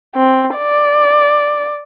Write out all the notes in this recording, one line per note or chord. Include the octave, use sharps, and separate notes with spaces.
C4
D5